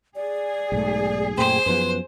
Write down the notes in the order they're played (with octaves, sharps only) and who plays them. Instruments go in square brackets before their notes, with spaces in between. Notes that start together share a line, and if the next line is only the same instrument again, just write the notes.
[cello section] G#4 [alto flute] D5
[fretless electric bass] B1 G#2 A3
[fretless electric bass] F#2 A#2 A3 [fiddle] C5 [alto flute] G5
[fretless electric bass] F#2 F3 B3 [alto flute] B4